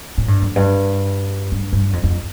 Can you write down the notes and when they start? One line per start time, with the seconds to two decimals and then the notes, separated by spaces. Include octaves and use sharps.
0.18 A2
0.28 G2
0.42 F2
0.56 G2
1.52 G2
1.73 G2
1.93 F2
2.03 F2